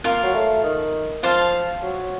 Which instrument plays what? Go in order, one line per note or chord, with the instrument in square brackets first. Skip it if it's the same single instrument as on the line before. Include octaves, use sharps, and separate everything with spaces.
[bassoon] A#3 [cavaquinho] F4 A#4 F5
[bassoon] F#3
A3
D#3
[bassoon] F3 [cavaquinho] F4 C5 F5 A5
[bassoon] F#3